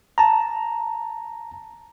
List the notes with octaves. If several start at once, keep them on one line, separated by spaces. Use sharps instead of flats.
A5 A#5